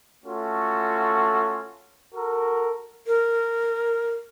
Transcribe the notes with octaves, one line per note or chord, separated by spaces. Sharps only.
A3 C#4 F4 F#4 A4
F#4 A4 A#4
A#4